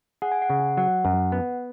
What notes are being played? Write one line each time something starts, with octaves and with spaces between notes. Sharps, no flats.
G#4 F#5
G#5
F#5
C#3
F#3 F#5
F#2
B3